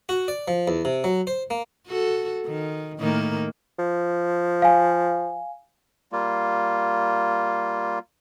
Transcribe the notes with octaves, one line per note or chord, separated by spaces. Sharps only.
F#4
D5
F3
E2
C3
F#3
C5
A#3
F#4 A4
D#3
A2 D#3 A#3
F3
F5 G#5
G3 A#3 F4